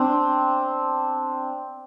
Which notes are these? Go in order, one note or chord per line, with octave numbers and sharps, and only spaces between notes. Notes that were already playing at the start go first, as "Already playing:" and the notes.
Already playing: C4 D4